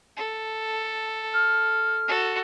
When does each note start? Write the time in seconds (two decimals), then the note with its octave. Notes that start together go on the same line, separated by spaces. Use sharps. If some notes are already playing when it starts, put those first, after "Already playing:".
0.17 A4
1.34 F6
2.08 F#4 A4